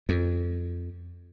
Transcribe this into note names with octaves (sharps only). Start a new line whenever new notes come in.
F2